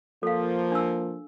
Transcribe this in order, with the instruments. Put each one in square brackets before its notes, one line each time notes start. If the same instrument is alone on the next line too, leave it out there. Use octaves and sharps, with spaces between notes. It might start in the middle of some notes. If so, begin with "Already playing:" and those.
[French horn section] F3 A#3 [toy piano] A4 F5
[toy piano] D4 E6